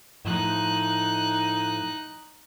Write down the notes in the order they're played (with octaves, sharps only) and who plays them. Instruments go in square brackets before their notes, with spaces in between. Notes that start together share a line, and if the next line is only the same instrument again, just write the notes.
[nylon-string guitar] A2 F3 [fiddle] D#4 F#6